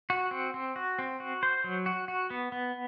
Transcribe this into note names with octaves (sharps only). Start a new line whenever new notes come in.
F#4
C4
C4
F#4
C4
F#4
C5
F#3
F#4
F#4
B3
B3